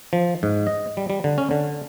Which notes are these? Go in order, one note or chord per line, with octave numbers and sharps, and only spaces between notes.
F3
G#2
D#5
G3
G3
D3
C#4
D3